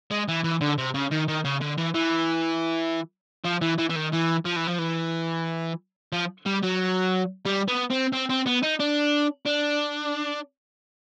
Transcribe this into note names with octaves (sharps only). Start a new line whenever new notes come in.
G#3
E3
E3
D3
C3
C#3
D#3
D#3
C#3
D3
E3
E3
F3
E3
E3
E3
D#3
E3
F3
E3
F3
E3
F3
G3
F#3
G3
B3
C4
C4
C4
B3
D#4
D4
D4